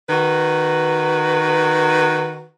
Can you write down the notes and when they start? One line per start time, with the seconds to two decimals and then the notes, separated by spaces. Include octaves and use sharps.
0.09 D#3 F#4 B4